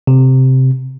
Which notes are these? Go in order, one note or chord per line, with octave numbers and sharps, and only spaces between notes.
C3